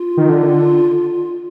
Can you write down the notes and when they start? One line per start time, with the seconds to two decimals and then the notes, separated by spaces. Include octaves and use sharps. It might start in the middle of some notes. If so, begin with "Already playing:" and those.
Already playing: F4
0.17 D#3
0.29 D3